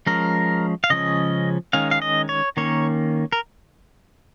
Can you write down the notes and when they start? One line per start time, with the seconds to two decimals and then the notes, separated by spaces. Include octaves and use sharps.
0.06 F3 G#3 C#4 A#4
0.84 F5
0.90 C#3 F3 G#3 C#4 D#5
1.73 D#3 G#3 C#4 F5
1.91 F5
2.02 D#5
2.29 C#5
2.57 D#3 A#3 C#4 C#5
3.32 A#4